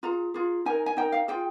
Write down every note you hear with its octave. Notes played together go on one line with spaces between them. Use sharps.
F4 G#4 A#5
F4 G#4
D#4 A#4 G#5
G#5
D#4 A#4 G5
F5
F4 G#4 G5